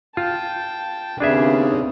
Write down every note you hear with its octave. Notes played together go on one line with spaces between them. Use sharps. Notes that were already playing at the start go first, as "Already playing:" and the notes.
F4 G5 A5
D#2 C#3 B3 C4 D4 G#4 E5